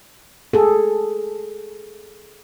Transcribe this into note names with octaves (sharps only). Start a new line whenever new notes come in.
G#4 A4